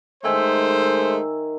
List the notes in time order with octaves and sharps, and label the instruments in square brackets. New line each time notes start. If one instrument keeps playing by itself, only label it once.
[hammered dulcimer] D#3 E5 G#5 [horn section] G#3 A3 C5